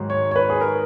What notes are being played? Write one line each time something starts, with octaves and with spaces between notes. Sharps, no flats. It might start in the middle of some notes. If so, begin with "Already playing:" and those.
Already playing: G#2 D#3 F#3
C#5
C#5
B4
G#4
A#4